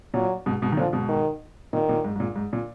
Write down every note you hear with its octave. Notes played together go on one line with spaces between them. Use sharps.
A#2 F#3
G#2 B2
G#2 B2
D#3
A#2 D3 F3
G#2 B2
D#3
A#2 D#3
A#2
G#2
G#2
A#2
G#2
A#2